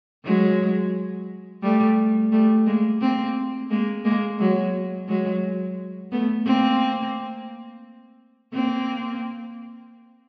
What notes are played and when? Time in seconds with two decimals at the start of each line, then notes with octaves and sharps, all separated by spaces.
0.25 F#3 G#3
1.63 G3 A3
2.32 G3 A3
2.67 G#3 A#3
3.01 A#3 C4
3.70 G#3 A#3
4.05 G#3 A#3
4.39 F#3 G#3
5.09 F#3 G#3
6.12 A3 B3
6.46 A#3 C4
8.53 A#3 C4